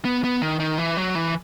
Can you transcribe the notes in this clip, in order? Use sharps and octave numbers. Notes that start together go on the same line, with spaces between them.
B3
B3
D#3
D#3
E3
F#3
E3